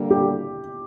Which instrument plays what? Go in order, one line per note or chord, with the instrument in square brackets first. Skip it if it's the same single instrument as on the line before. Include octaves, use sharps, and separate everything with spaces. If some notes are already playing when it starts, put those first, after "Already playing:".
Already playing: [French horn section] D3 G3 A#3
[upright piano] G4